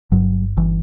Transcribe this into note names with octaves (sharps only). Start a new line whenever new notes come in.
G1 G2 F#3
G1 E3